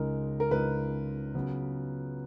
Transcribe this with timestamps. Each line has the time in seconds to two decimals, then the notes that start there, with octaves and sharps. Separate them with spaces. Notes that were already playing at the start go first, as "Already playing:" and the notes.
Already playing: C#2 C#3 G#3 D#4 A#4
0.40 A#4
0.51 C#2 C#3 G#3 D#4 B4
1.35 C#3 F#3 B3